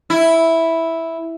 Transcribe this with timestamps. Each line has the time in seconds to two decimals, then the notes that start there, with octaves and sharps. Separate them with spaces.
0.10 E4